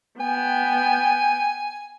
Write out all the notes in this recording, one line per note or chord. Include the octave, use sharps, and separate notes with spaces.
B3 G5 G#5